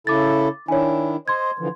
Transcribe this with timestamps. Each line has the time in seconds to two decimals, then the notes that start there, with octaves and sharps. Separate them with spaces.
0.07 C#3 E4 A4 D6 A6
0.68 D#3 D4 E4 C#5 G#5
1.28 C5 D#5 C6 G#6
1.59 D3 E3 F3